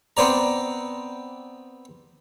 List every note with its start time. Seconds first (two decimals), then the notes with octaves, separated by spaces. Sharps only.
0.17 B3 C4 D5 A#5